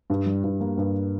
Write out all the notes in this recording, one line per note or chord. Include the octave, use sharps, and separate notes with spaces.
G2
G3
G2
A#3
G2